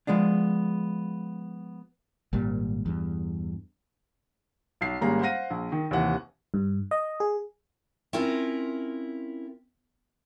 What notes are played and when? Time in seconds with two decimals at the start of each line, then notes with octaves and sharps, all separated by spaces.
0.07 F3 G#3 B3 D4
2.33 G#1 A#2 G3
2.86 E2 G2
4.81 B1 C7
5.01 G#1 G3 A#3 C#4 G#4 A#5
5.21 C5 F5 F#5 A#6 D#7
5.50 A#1
5.72 D#3
5.91 D#2 C3 E3 F#5
6.54 G2
6.91 D#5
7.20 G#4
8.13 C4 C#4 E4 F4 A#4